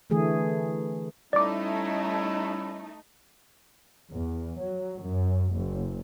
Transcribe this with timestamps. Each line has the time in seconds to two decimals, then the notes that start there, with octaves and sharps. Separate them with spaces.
0.10 D3 E3 A3 G#4
1.33 G3 A3 C#4 D#4 E4 D5 D6
4.10 E2
4.58 F#3
5.02 F#2
5.54 F#1